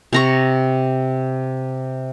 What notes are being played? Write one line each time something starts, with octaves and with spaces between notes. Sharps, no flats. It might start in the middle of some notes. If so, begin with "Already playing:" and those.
C3 A#5 C#6